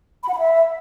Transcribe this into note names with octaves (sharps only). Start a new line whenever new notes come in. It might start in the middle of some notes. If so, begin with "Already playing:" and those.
B5
F#5
B5
E5